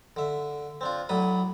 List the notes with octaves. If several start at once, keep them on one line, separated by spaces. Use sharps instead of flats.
D3 E5
C4 D4 F4
A2 F#3 D5 B5 D#6